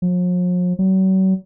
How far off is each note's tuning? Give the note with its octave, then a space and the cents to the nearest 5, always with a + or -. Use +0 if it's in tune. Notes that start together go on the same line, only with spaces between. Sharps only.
F3 +45
F#3 +40